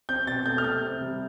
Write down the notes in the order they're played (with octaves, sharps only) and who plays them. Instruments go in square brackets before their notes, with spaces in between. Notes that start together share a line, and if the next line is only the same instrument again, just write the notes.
[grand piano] C4 G6
B2 A6
A3 G6
F6
C3 G6
C3
G3